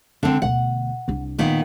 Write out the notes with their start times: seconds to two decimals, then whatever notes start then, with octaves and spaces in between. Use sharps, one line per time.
0.23 C#2 D3 C4
0.42 D2 B2 F#5
1.08 C2 D4
1.38 A#2 D#3 B3